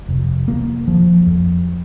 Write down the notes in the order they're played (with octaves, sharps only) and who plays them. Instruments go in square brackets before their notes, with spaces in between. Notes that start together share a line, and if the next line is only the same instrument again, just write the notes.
[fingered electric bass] F1
A#3
F3
F2